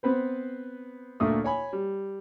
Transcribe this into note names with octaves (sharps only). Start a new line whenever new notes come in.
B3 C4 B4 C5
D2 A#2 A3 D#6
C#5 G#5 B5
G3